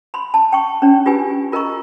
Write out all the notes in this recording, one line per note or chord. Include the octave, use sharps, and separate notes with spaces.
B5 C6
A5
G5 C#6
C#4 D4 C#5
F4 G4 B4 G#5
F4 A#4 D#5 A#5 C#6